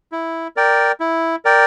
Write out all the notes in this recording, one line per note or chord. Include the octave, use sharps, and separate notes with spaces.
E4
A#4 D5 G5
E4
A#4 D5 G5